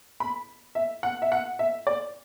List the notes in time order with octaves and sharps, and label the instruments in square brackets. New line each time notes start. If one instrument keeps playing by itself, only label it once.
[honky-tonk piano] B5
E5
F#5
E5
F#5
E5
D5